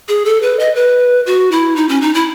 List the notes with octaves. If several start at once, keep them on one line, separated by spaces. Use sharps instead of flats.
G#4
A4
B4
D#5
B4
F#4
E4
D#4
C#4
D#4
E4